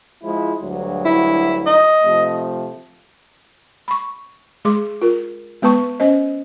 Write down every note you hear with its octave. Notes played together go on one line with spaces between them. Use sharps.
F3 G#3 E4
D2 G2 F#3
E4
D#5
C3 F3 A3
B5 C#6
G#3 G#4 C6 D6
F4 A#4
G#3 B3 B4 A5 C#6
C#4 C5 D#5